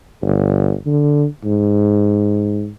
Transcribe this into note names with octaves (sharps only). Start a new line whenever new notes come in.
G1
D3
G#2